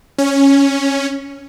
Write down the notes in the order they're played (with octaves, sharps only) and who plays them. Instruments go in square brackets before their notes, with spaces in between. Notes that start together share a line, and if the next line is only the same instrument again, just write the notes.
[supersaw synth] C#4